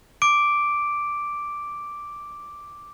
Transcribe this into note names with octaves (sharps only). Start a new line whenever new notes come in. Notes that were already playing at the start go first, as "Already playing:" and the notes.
D6 D7